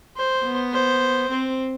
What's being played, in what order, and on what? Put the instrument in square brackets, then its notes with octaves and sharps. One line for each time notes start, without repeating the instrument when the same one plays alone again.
[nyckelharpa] C5
[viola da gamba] B3
[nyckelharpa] C5
[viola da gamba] C4